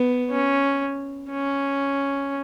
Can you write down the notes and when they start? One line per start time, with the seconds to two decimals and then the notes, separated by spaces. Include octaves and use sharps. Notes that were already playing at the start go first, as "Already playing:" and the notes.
Already playing: B3
0.30 C#4
1.30 C#4